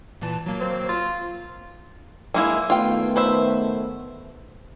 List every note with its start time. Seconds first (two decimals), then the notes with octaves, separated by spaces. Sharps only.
0.22 A#2 E3 A5
0.46 F#3 A#3
0.60 C4
0.89 F4
2.34 G#3 A#3 E4
2.70 D#3 A3 B3 F4 G5
3.16 B4 C5 E5